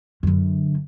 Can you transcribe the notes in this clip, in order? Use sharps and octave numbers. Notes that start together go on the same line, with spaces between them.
F#2 D3